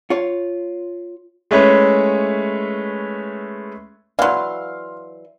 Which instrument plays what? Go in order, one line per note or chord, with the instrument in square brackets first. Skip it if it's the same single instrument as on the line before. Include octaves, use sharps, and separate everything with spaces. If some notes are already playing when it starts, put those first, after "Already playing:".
[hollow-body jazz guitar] F4 C#5
[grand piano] G#3 A3 C#4 E4 B4 C#5
[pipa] E3 F#3 [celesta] D5 [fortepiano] F5 C6